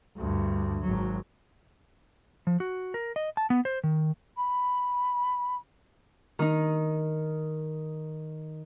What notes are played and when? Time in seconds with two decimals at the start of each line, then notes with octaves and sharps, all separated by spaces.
0.17 D2 G2
0.83 G#1 F#3
2.47 F3
2.60 F#4
2.94 A#4
3.16 D#5
3.37 A5
3.50 B3
3.65 C5
3.84 D#3
4.36 B5
6.39 D#3 D#4